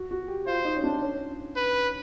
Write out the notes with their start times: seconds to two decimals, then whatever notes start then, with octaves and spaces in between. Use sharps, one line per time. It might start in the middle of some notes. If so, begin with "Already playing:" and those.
Already playing: F#4
0.11 F#4
0.28 G4
0.47 F4 C5
0.65 D#4
0.77 C#4
0.84 D4
1.02 C#4
1.56 B4